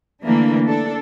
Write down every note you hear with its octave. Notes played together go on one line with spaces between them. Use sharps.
D3 E3 A3 A#3 D4
D4 A4